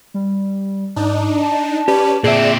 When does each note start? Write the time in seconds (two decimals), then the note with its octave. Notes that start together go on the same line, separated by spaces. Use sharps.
0.14 G3
0.96 G#2 D4 D#4
1.42 A5
1.88 C#4 G4 B4 D5
2.24 A#2 C4 G#4 D5 E5